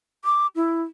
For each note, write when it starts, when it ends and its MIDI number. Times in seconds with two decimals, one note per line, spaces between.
0.25 0.47 86
0.56 0.83 64